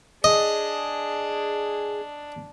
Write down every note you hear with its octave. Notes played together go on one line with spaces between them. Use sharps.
D4 G#4 D#5